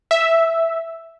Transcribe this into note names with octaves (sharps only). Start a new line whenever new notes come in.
E5